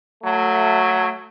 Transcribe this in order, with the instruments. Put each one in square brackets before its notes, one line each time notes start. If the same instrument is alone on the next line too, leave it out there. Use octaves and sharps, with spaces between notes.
[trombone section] F#3 A3